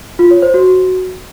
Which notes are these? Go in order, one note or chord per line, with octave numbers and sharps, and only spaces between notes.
F4
C#5
C5
F#4